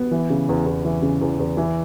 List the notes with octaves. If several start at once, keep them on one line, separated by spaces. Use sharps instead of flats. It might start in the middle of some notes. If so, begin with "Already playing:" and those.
Already playing: B3
E3
C#3
E2
E2
E3
C#3
E2
E2
E3